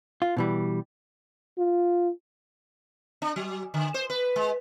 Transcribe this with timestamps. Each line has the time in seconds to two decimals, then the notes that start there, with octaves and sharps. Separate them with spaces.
0.22 F4
0.37 B2 E3 G3
1.58 F4
3.22 D4
3.36 F#3
3.74 D3
3.94 C5
4.10 B4
4.36 G#3